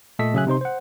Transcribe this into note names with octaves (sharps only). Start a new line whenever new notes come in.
A#2 A3 A4 D#5 B6
C#3 F#3 G#4 E5 G#5 F#6
C3 D#4 C5 C6
C5 F#5